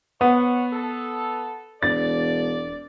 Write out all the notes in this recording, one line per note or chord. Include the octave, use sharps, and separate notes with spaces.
B3 C5 C#5 F#5
A4
E1 D5 A6